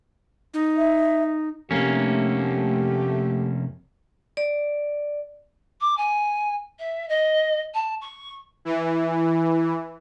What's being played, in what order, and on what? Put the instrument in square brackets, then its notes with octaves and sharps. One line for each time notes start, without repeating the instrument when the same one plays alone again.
[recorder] D#4
[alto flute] E5
[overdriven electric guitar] F2 C3 [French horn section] A3 G4 [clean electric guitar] A#3 C#4
[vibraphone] D5
[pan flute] D6
G#5
E5
D#5
A5
C#6
[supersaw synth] E3